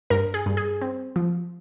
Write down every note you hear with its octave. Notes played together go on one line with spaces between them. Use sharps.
G2 A#4
G#4
G2
G#4
C4
F3